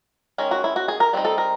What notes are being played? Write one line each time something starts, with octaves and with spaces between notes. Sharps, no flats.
D#3 G#3 C#4
F#4
E4
F#4
G#4
A#4
G3 C4 D#4
A4
A#4